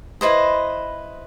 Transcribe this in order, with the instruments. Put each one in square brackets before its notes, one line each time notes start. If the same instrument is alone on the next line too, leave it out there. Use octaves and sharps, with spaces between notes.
[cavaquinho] E4 B4 C5 D#5